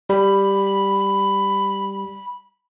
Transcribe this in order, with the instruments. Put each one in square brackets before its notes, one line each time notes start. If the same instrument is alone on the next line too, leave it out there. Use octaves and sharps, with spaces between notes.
[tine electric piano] G3 [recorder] B5